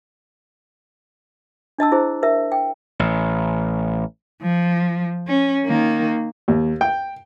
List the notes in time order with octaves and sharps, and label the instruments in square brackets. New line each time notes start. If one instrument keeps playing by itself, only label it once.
[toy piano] D4 D#5 A5 E6
E4 G#4 C5
A#4 E5
G5
[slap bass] A1
[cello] F3
C#4
D#3 A#3
[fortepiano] D#2
G5